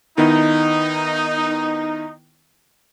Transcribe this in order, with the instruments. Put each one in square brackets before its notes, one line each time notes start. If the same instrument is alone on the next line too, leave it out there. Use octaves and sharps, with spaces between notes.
[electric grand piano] D#3 B3 E4 [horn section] D#4